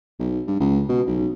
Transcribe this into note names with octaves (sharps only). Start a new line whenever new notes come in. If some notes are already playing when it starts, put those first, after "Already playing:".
B1
G2
C#2
B2
B1